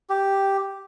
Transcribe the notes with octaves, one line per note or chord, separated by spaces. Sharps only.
G4